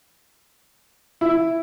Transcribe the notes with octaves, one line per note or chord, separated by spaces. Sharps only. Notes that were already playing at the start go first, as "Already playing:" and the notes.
E4